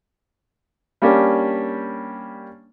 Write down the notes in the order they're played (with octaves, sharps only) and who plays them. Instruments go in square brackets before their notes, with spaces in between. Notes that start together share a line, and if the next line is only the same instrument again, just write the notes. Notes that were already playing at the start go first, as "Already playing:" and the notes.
[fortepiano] G3 A#3 C#4 D4 G4